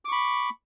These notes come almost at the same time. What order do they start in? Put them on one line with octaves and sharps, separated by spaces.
D6 C#6 B5